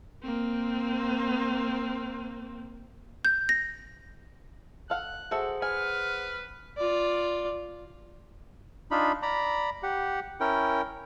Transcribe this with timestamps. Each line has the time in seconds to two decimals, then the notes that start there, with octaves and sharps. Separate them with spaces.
0.23 A#3 C4
3.25 G6
3.49 A#6
4.90 A4 F5 F#5 F#6
5.31 F#4 G#4 A4 C5 E5 F#5
5.62 B4 G#5 F6
6.77 F4 D5
8.91 D4 D#4 F4 B5
9.22 D5 A#5 B5
9.83 G4 F#5
10.40 C#4 E4 A#4 G5